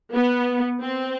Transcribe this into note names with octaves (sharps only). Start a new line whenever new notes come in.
B3
C4